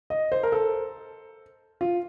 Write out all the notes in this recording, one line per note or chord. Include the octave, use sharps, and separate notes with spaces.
D#5
C5
A#4
A4
F4